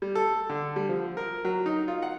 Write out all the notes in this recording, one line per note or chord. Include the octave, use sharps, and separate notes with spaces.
G3
A4
D3
G3
F3
A#4
F#3
D#4
F4
F#5